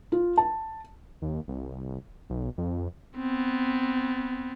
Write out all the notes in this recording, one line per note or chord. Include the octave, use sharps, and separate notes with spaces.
F4
A5
D#2
C2
B1
F2
B3 C4